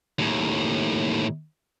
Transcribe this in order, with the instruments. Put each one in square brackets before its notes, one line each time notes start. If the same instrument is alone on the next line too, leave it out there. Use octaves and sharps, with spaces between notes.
[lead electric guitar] D#2 A2